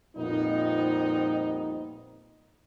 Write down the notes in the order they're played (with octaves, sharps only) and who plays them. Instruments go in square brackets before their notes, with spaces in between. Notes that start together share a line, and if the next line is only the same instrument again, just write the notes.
[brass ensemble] F2 A#2 G3 B3 C4 D#4